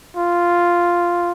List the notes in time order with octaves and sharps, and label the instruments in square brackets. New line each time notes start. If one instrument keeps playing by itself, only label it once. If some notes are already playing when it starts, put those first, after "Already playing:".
[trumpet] F4